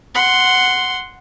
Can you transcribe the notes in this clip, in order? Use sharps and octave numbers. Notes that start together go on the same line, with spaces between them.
F#5 C6